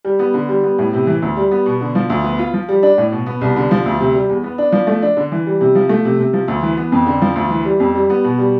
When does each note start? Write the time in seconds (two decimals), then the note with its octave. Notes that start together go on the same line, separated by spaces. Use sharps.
0.05 G3
0.19 B3
0.34 D3
0.49 G3
0.63 B3
0.78 A2
0.93 C3
1.07 E3
1.22 D2
1.37 G3
1.51 B3
1.66 B2
1.81 D3
1.95 F3
2.10 D2
2.24 B3
2.39 F4
2.53 F3
2.69 G3
2.83 D4
2.98 A2
3.12 B2
3.26 B3
3.41 C2
3.56 D3
3.71 F3
3.86 D2
4.00 C3
4.15 G3
4.30 E2
4.44 B3
4.58 D4
4.72 F3
4.87 A3
5.02 D4
5.17 D3
5.32 E3
5.47 G3
5.61 C3
5.75 F3
5.89 A3
6.05 C3
6.19 C3
6.33 F3
6.48 D2
6.63 E3
6.77 B3
6.92 F2
7.06 D3
7.22 F3
7.36 D2
7.50 E3
7.65 G3
7.80 F2
7.95 G3
8.10 B3
8.24 B2
8.38 G3